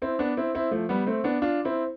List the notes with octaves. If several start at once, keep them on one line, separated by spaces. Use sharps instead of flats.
C4 E4
B3 D4
C4 E4
C4 E4
F3 A3
G3 B3
A3 C4
B3 D4
D4 F4
C4 E4